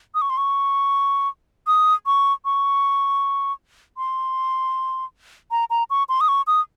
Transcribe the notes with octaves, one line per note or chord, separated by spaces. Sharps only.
D#6
C#6
C6
C#6
D#6
C#6
C#6
C6
A#5
A#5
C#6
C6
D#6
C#6
D#6